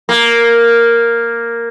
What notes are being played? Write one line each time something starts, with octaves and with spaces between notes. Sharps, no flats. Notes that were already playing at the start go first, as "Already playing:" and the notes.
A#3